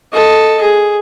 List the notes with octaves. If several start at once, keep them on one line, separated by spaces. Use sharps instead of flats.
A4 D#5
G#4